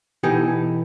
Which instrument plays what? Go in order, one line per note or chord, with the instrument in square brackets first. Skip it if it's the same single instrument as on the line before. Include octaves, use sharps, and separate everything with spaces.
[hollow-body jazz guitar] B2 E3 B3 D#4 G4 A4